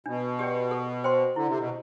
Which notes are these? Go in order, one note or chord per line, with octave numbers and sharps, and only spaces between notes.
B2 D4
G4 D5 G5
A4
C5 G5 C6
D3 E4
C3
B2